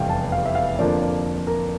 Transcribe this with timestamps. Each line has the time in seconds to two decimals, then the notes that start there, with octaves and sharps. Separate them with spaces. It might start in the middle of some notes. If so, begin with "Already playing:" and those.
Already playing: F1 E2 C3 G3 F5 G5
0.09 A5
0.32 F5
0.46 E5
0.55 F5
0.78 F2 D3 F3 A#3 D4 D5
1.01 D5
1.47 A#4